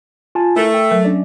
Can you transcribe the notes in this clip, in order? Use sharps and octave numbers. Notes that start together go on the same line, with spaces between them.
F4 G#5 A5
A3 E4 A#4
G5
F#3 A#4
C#4 D4 D5